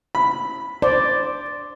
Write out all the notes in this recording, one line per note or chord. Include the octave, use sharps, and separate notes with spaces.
B5
C5 D5